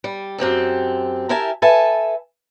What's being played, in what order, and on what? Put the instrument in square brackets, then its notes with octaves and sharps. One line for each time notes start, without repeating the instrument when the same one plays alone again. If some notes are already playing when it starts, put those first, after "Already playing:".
[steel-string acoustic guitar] G3
F#2 C4 G4 A4
E4 G4 A#4 E5 G#5 A5
A4 B4 E5 G#5 A5